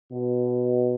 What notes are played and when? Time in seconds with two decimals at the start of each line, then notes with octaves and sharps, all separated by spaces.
0.12 B2